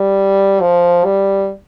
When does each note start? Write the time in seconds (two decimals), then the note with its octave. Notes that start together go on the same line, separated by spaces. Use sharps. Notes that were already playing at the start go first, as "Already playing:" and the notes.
Already playing: G3
0.61 F3
1.04 G3